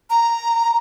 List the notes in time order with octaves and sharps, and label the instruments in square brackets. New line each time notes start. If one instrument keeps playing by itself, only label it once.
[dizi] A#5